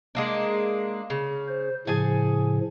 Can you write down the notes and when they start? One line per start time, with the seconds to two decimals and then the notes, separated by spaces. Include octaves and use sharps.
0.15 G#3 A#3 D4
1.10 C#3
1.48 C5
1.87 A2 C#3 F3 G#4 A4 G#5